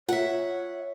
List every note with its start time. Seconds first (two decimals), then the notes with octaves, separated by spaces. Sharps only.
0.09 F4 C#5 E5 F#5